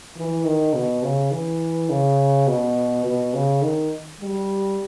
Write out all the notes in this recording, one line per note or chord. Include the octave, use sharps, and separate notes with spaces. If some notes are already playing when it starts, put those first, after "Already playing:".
E3
D#3
B2
C#3
E3
C#3
B2
B2
C#3
D#3
G3